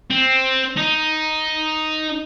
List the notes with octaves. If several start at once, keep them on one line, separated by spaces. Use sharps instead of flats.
C4
D#4